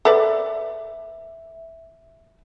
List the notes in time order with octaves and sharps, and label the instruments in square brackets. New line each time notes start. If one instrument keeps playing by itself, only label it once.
[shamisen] A4 B4 D5 [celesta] E5